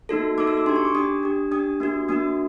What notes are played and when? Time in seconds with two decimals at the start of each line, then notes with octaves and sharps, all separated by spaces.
0.09 A#3 D#4 F#4 A4
0.38 A#3 D#4 F#4 A4 D6
0.47 E6
0.57 D6
0.66 D4 G4 C6
0.76 C#6
0.85 D6
0.95 D4 G4 D#6
1.23 D4 G4
1.52 D4 G4 D#6
1.80 A#3 D4 F#4
2.09 A#3 D4 F#4 D#6